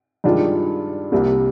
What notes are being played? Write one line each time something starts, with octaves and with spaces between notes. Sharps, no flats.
G2 D#3 G#3 D4 F4
C2 C3 G3 A#3